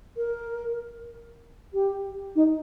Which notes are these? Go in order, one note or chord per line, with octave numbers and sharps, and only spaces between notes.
A#4
G4
D#4